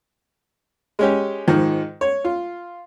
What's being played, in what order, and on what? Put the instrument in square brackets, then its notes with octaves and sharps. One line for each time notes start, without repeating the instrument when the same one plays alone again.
[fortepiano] G#3 C#4 G4
G#2 D#3 F3
C#5
F4